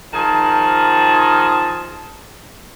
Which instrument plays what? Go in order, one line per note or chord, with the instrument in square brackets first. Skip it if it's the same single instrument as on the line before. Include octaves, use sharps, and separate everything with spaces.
[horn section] D#3 F3 G#4 A5